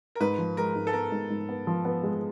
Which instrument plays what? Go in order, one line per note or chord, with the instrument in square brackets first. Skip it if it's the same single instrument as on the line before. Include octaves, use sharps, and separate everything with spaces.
[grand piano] A#4
[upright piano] G#2 [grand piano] B4
[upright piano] F3
[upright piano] G#3 [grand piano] A#4
[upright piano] G#2
[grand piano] A4
[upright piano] B3 [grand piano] A#4
[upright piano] G#2
G#2
B3
F3
B3
G#3